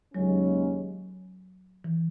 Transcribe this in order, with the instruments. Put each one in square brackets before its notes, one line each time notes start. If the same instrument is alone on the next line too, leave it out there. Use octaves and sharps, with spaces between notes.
[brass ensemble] D#2 C#3 G#3 C#4 [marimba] F#3
[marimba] E3